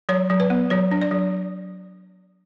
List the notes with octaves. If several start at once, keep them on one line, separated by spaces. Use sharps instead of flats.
F#3 C#5
F#3
B4
B3
F#3 C#5
D4
D5
F#3